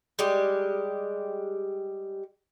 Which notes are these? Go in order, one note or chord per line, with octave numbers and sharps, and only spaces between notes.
G3 G#3 G4